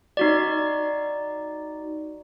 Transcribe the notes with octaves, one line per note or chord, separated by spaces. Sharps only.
D#4 F#4 D5